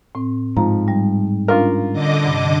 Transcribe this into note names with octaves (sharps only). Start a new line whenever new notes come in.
A2 C4
G#2 F3 A#5
G3
C#4 D4 F4 A#4 F5
D3 D#5 D6
G2 C3 D4